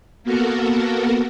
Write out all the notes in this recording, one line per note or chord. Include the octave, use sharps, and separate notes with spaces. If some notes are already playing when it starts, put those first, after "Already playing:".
A#3 B3 F#4 A4 A#4